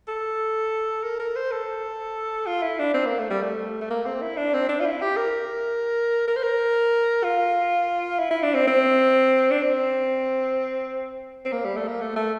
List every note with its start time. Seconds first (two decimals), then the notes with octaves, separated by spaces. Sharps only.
0.08 A4
1.04 A#4
1.19 A#4
1.36 C5
1.52 A4
2.47 F4
2.62 E4
2.79 D4
2.94 C4
3.06 A#3
3.19 A3
3.30 G3
3.43 A3
3.81 A3
3.90 A#3
4.06 C4
4.22 E4
4.37 D4
4.54 C4
4.69 D4
4.80 F4
4.86 E4
5.02 G4
5.17 A#4
6.28 A#4
6.36 C5
6.43 A#4
7.24 F4
8.19 E4
8.31 E4
8.43 D4
8.54 C4
8.67 C4
9.51 D4
9.62 C4
11.45 C4
11.52 A#3
11.64 G3
11.77 A3
11.88 A#3
12.01 A3
12.16 A3